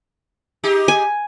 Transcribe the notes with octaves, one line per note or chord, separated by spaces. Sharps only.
D#4 G4 G#4
G#5